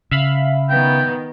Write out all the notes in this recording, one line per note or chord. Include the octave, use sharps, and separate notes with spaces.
C#3 E5 F5 B5
D#3 B3 G5